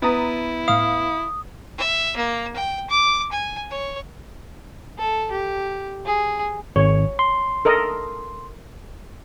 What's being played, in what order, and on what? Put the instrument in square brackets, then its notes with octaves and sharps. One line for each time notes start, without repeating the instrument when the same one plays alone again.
[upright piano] B3 [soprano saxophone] E4 [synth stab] A#5 D#6 A6
[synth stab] A2 F5 [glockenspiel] D#6
[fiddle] E5
A#3
G5
D6
G#5
C#5
[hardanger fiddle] A4
G4
G#4
[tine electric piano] G#1 [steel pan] C#5
[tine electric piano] C6
[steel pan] A4 A#4 D#5